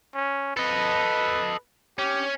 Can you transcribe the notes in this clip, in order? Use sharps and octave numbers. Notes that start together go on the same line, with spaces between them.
C#4
A4 B4 D#5
C#4 G4